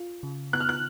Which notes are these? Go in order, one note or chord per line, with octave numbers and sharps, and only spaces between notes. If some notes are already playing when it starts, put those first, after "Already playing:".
Already playing: F4
C#3
B3 F#6
F6
F#6